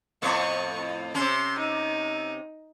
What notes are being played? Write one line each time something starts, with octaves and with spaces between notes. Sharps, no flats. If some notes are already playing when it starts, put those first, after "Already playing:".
F2 A2 B3 C#6
C3 C#4 C6
D#4